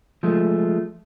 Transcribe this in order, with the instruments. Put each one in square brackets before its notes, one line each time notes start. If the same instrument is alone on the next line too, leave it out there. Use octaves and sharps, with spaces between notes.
[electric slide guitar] F3 G#3 A3